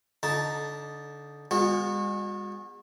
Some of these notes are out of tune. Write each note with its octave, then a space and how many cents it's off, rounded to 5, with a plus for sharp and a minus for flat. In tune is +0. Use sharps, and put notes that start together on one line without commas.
D3 -25 D#4 -5 A5 +0
G#3 -45 B3 +0 F#4 -35